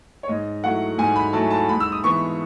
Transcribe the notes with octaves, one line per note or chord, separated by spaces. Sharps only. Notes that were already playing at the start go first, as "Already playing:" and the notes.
C#5
G#2 D#5
F#3 A3 E4 F#5
G#2 G#5
B5
F#3 A3 E4 A5
A5
G#2 B5
E6
D#6
E3 B3 C#6